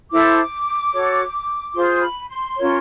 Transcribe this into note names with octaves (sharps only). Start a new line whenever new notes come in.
E4 A4 C5 D6
F#4 A4 C#5
F4 G#4 C5 C6
B5
C6
C#4 F4 A#4 C#5